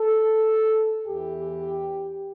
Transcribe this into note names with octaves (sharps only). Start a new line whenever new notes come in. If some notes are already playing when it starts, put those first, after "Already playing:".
Already playing: A4
E2 E3 G4